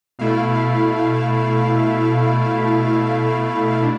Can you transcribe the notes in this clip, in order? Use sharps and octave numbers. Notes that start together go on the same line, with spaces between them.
B2 A3 E4 F5
D4